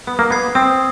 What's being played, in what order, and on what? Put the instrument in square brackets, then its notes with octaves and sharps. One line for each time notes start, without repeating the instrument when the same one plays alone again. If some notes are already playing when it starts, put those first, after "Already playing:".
[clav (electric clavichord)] B3 [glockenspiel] D#6
[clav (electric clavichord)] A#3
[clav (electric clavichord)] B3 [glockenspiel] G#6 C7
[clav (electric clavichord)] C4 [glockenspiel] D#6